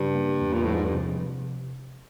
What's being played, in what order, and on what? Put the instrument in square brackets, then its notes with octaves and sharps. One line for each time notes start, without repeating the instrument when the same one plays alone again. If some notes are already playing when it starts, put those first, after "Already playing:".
Already playing: [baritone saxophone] G2 [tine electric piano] C#3
[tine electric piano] A#3
E2
[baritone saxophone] A#2
[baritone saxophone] A2 [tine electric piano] F3
[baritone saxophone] G#2
G2
[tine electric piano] C3